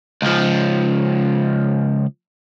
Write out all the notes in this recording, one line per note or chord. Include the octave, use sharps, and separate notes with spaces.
C#2 F3